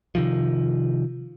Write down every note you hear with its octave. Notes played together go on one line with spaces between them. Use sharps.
C3 D#3 F3